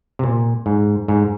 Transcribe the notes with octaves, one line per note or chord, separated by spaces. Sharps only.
C3
A#2
G#2
G#2